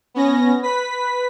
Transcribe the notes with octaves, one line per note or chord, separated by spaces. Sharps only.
B3 C#4 A#6
B4 B6